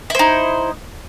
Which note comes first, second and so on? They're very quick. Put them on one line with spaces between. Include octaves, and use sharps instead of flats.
E4 C5 D#4